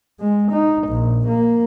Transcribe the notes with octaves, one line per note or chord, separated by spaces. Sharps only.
G#3
D#4
A#1
A#3